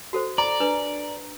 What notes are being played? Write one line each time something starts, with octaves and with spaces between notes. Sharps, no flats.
F#4 A4 C5
D5 A#5
D4 B4